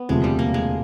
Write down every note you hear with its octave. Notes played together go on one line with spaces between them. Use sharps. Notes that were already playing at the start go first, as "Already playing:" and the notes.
Already playing: B3
E1 D2 C3 F3 G#3
G3
A#3
G#3